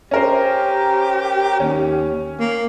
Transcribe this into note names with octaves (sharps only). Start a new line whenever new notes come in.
C#4 G4 A#4 C5
D#2 C#4
A#3